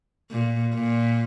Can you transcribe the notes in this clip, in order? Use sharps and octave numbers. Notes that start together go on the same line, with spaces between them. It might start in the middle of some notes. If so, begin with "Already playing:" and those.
A#2
A#2